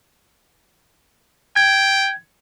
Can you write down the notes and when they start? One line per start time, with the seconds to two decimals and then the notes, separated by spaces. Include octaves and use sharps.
1.56 G5 G#6